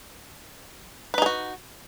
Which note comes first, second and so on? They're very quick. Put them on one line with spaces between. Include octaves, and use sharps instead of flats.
B4 D#4 G#4 F#4